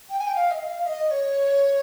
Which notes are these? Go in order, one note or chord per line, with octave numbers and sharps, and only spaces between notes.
G5
G#5
G5
F5
D#5
F5
D#5
C#5